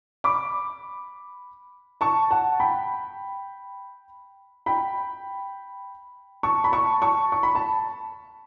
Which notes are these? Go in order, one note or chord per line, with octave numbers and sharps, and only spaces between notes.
B5 D6
A5 C#6
F#5 A5
G5 B5
G5 B5
A5 C#6
B5
A5 C#6
A5 C#6
C#6
B5
A5